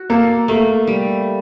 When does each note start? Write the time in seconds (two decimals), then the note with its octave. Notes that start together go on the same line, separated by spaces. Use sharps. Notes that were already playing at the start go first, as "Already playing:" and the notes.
Already playing: F#4
0.10 A#3 A4
0.48 A3 A#3
0.87 G3